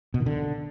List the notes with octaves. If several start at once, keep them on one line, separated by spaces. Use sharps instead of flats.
B2
D#3
D3